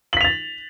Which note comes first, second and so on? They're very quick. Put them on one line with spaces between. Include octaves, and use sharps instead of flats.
F#7 B6 F7 A6